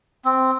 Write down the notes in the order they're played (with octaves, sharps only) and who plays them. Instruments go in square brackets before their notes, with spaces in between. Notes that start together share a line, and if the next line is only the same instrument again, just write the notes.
[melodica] C4